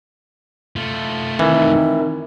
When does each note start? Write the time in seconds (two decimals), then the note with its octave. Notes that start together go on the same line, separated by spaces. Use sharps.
0.76 A3 F4
1.39 D#3 E3 C4 D#4 A#4